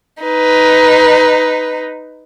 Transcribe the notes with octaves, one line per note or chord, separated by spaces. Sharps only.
D#4 B4